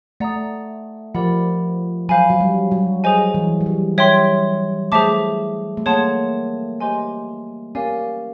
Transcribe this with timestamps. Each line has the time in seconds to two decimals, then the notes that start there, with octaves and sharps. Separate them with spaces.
0.20 A3 D5 F#5 A#5 D#6
1.15 F3 G4 A#4 D5 F#5 B5
2.09 F#3 C5 F5 G#5 B5
2.30 F#3
2.40 G3
2.71 F#3
3.04 G#4 C5 D#5 G#5
3.34 E3
3.61 G3
3.66 F#3
3.98 G3 C#5 E5 G5 C6
4.92 A3 G#4 C5 E5 A5 D6
5.77 A3
5.86 A#3 G#4 C#5 F#5 A5 C6
6.81 G4 C5 D#5 G#5 C6
7.75 C#4 G4 A#4 D5 F5 G#5